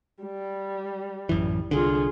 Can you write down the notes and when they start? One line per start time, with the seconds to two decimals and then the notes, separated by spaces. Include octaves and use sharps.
0.23 G3
1.29 A1 F#2 E3
1.71 C2 D3 F4 G#4